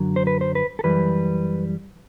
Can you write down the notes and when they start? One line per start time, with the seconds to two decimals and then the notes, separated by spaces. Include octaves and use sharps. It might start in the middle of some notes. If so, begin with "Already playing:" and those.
Already playing: F#2 D3 F#3
0.16 C5
0.27 B4
0.41 C5
0.55 B4
0.79 A4
0.84 F#2 E3 G3 B4